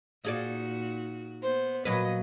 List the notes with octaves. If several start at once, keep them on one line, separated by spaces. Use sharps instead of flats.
A#2 D#4 F#4 G#4 D5
B3 C5
A#2 F#3 B4 D#5